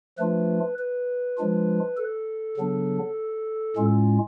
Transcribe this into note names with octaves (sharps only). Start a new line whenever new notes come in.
F3 A3 D4 F4 B4
B4
F3 G#3 D4 F4
A4
C#3 F#3 B3 D4
A2 G#3 C#4 F4